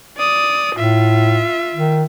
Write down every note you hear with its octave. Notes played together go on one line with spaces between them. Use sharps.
D5 D#6
A2 F4 E5
D#3